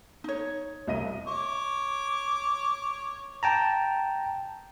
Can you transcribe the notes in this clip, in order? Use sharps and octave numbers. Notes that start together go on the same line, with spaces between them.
D#4 C#5
C2 D#5 D#7
C#5 D6
G5 A5 A#5